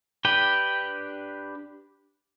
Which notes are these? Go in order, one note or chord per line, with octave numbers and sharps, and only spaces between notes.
D4 G4 B4 G5